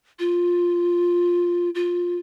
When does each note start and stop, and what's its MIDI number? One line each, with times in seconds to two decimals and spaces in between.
0.19 1.70 65
1.75 2.17 65